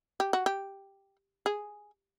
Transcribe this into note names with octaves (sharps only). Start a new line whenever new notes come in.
G4
F#4
G4
G#4